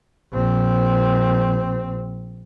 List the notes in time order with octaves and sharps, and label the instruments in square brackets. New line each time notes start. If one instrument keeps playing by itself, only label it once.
[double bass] A#1 C4